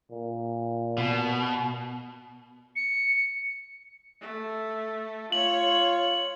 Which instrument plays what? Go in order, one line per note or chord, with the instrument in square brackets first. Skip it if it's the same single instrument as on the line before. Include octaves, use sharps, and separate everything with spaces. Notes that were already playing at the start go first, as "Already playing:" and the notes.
[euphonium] A#2
[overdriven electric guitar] B2
[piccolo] C#7
[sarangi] A3
[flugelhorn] F4 [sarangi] C#5 [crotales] F#7